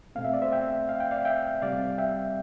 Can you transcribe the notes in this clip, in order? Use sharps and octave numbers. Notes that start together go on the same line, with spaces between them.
B2 A3 C4 F5
E5
D5
C5 E5
E5 G5
F5
G5
D5 F5
E5 G5
C3 G3 C4 D5 F5
E5 G5